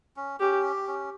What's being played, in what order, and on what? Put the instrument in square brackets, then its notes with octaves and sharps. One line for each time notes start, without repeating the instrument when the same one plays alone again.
[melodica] C#4
[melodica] C#4 [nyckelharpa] G4
[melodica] G4
C#4